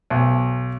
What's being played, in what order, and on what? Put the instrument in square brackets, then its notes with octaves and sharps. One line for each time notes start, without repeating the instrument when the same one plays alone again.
[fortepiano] B1